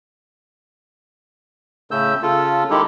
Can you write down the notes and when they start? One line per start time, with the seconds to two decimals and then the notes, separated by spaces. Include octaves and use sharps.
1.91 A2 C#3 A3 E6 G6
2.22 C#3 F4 A4
2.70 D#3 G#3 D#4 E4 G4 A4